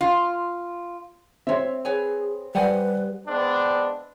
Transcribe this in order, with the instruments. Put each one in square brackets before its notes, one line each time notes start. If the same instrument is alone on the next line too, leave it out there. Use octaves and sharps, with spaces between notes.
[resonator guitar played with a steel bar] F4
[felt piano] C4 C6 [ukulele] C#5 E5
[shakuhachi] G#4 [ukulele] B4 C#5 G#5
[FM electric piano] G3 [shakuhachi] B4 [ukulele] C5 F#5 G#5
[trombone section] G#3 B3 C4 D4